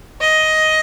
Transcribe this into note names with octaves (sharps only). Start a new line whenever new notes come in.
D#5